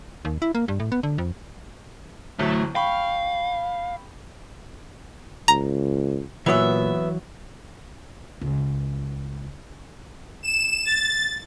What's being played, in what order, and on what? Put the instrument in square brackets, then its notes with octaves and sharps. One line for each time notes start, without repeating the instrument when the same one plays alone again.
[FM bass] D#2
E4
A#3
G2
A2
B3
D3
F2
[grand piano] D1 A1 F#3 [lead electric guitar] A3
[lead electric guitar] F5 [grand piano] G5 B5 C#6
[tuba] C#2 [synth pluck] A#5
[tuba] A#2 [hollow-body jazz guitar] E3 F#3 [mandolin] B3 E5
[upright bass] C#2
[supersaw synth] E7
A6